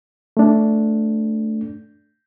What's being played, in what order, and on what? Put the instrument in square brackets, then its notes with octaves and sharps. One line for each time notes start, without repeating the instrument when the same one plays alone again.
[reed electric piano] A3 D4